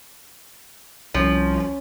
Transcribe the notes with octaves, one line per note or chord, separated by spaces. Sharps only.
C2 F3 C#4